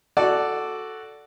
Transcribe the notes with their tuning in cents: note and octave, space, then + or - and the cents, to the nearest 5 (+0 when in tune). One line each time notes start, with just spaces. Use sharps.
F#4 +0 A4 +0 D5 +0